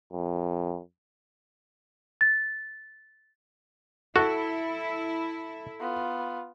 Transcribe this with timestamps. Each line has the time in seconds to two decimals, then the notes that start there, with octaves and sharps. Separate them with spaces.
0.13 F2
2.21 A6
4.16 E4 F#4 A4
5.80 B3 F4